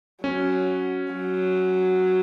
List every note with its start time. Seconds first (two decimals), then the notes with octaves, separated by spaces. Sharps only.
0.24 F#3 C#4
1.12 F#3